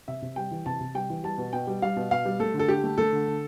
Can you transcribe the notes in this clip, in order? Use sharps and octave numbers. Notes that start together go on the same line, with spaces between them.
C3 E5
C3
G3 G5
E3
C3 A5
C3
G3 G5
E3
G3 A5
B2
B2 G5
G3
G3 F5
B2
B2 F5
G3
A3 A4
D3
A4
D3 G4
A3
A3 A4
D3
D3